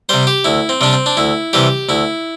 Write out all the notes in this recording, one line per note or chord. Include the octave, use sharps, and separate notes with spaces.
C3 G3 C5
G4
D2 E4
C4
C3 G3 D4
C4
D4
D2 E4
C3 E3 G3 G4
D2 E4